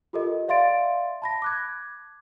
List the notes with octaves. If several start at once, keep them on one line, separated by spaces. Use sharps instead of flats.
F4 G4 A4 A#4 D#5
D5 E5 F5 C6 A6 D7
A5 B5 A#6
D6 F#6 G#6